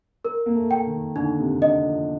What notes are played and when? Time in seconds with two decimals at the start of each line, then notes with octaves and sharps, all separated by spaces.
0.25 A#4
0.46 A#3
0.55 A3
0.71 G5
0.86 D#3
1.16 D3 D#4
1.39 C3
1.61 D3 D#5
1.85 F3